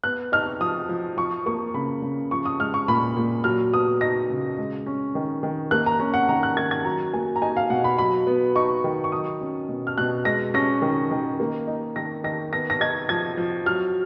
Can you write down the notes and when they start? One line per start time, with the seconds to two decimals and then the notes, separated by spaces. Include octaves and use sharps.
0.04 B3 F#6
0.32 D#4 F6
0.60 F3 D#6
0.89 F3
1.17 F3 C#6
1.46 A#3 C#6
1.74 C#3 B5
2.02 C#3
2.31 F3 C#6
2.46 D#6
2.59 G#3 F6
2.74 C#6
2.88 A#2 B5
3.16 A#2
3.44 F#3 F6
3.73 B3 D#6
4.01 D#4 A#6
4.30 C#3
4.58 G#3
4.86 C#4
5.15 D#3
5.43 D#3
5.71 A#3 F#6
5.86 A#5
6.00 C#4
6.14 F#5
6.29 D#3 A#5
6.43 F#6
6.57 D#3 G#6
6.71 G#6
6.85 F#3 A#5
7.14 A#3 G#5
7.36 A#5
7.42 D#4 G#5
7.57 F5
7.70 B2 F#5
7.84 B5
7.98 F#3 B5
8.27 B3
8.56 D#4 C#6
8.84 D#3
9.04 C#6
9.12 F#3 D#6
9.41 C#4
9.69 B2
9.87 F6
9.98 B2 F#6
10.25 G#3 A#6
10.54 C#4 A#6
10.82 D#3
11.11 D#3
11.40 A#3
11.67 D#4
11.96 D#3 A#6
12.24 D#3 A#6
12.53 B3 A#6
12.70 A#6
12.81 D#4 G#6
13.09 F3 G#6
13.37 F3
13.66 F#3 F6